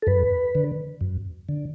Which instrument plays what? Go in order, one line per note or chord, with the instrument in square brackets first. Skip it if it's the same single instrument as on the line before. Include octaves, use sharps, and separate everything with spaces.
[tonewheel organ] A4
F#2 B4
D3
F#2
D3